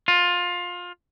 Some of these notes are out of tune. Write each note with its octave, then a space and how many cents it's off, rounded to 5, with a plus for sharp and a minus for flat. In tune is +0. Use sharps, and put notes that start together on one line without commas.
F4 +20